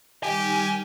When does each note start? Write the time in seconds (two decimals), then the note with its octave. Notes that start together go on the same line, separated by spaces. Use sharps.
0.23 D#3 G3 G4 G#5 F6